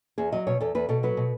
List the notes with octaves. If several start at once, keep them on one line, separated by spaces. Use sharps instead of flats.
E2 G#4
F#3 D#5
B2 C#5
E2 A4
E2 B4
B2 A4
F#3 B4
B2